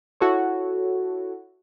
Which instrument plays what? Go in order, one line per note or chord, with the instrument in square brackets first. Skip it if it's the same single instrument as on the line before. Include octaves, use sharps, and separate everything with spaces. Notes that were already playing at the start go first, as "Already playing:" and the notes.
[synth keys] E4 F#4 A4 C#5